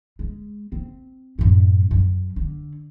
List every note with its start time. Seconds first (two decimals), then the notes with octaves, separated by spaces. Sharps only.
0.19 G#3
0.72 C4
1.39 F#2 A2
1.91 F#2
2.36 D3